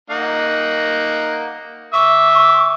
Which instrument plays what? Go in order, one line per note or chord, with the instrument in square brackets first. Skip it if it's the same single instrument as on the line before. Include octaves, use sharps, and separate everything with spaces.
[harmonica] A#3 D#4 F#5
[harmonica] E5 D6 E6 [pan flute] C#6